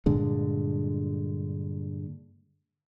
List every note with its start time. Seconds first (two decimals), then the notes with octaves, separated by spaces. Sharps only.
0.06 G2 A#2 D3 G#3